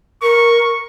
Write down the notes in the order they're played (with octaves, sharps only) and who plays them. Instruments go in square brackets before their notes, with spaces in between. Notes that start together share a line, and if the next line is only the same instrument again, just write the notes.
[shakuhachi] A#4 [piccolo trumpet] C#6